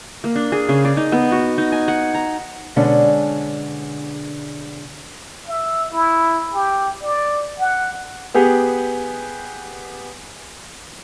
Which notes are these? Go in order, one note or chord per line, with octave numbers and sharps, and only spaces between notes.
A#3
D4
G#4
C#3
D5
D#4
B3
F#4
D#4
G#5
F#5
A#5
B2 D3 G#3 C#4 D4
E5
E4
G4
D5
F#5
B3 G4 G#4